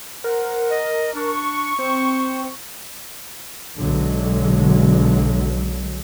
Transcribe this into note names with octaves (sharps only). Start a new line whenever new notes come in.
A#4 C5 F#5
D#5
D4 C#6
C4 C5
B1 D3 F#3 G#3